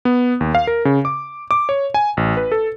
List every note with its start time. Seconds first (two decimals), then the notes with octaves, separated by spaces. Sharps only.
0.05 B3
0.41 D#2
0.55 F5
0.67 A#4
0.85 C#3
1.05 D6
1.51 D6
1.69 C#5
1.94 G#5
2.17 A1
2.37 B4
2.52 A4